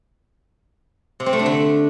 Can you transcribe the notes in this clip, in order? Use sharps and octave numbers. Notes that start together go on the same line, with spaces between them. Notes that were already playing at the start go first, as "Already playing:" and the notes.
C3
C4
A3
D4
D3